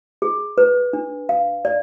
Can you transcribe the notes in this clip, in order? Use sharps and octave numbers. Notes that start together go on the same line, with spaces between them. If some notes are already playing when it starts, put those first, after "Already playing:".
G#4
B4
D4
F5
D5